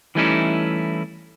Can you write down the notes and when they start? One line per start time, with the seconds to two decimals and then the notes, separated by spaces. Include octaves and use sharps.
0.15 E3 G3 A3 C#4 D#4 E4